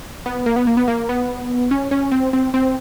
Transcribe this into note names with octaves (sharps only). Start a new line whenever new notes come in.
B3
A#3
B3
A#3
B3
A#3
B3
C#4
C#4
C4
C4
C4